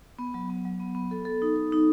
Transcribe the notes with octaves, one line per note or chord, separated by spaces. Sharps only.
B3
F#3
B3
F#3
B3
B3
A4
A4
D#4
A4
D#4